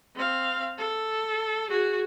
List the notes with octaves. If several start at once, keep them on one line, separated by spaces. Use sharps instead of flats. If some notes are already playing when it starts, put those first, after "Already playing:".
C4 F5
A4
F#4 G#4